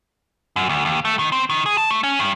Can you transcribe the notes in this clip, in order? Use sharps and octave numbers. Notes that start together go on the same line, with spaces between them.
F#2
D2
D#2
A3
D#3
C4
D#3
G#4
A5
A3
C#4
G2